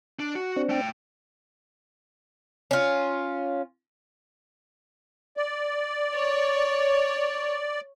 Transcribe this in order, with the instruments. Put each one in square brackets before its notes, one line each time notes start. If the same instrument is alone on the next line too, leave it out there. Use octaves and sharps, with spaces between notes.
[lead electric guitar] D4
F#4
[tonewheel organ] C4 D4
[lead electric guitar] A3 G5
[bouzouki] C#4 F4
[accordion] D5
[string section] C#5